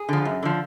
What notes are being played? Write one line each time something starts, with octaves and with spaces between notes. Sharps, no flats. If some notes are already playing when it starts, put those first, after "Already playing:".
Already playing: G#4
D3 F3
F#2
D3 F3